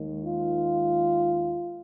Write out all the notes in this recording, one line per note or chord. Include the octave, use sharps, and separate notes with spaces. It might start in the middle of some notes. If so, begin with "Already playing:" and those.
Already playing: D#2 D#3 G#3
F4